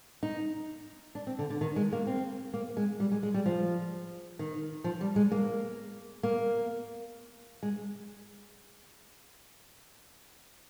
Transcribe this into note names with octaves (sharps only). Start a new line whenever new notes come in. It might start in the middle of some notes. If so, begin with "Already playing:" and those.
D#4
D4
C4
D3
D3
D#3
G#3
A#3
C4
A#3
G#3
G3
G#3
G#3
G3
F3
D#3
F3
G3
G#3
A#3
A#3
G#3